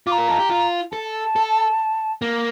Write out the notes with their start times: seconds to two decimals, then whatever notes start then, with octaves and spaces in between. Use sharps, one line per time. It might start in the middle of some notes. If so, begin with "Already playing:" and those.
0.07 F4 D6
0.12 A#5
0.18 A#4
0.29 A4
0.39 G4
0.49 F4
0.92 A4 A5
1.36 A4
2.22 A#3